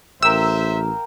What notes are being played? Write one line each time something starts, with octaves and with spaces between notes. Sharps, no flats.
A1 A#3 A#4 C5 E5 G5 E6